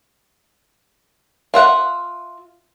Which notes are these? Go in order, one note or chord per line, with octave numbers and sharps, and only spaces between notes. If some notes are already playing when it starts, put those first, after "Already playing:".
F4 E5 F#5